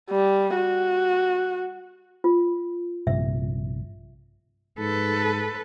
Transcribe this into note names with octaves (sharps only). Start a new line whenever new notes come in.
G3
F#4
F4
A#1 G2 C3 E5
G#2 A4 B4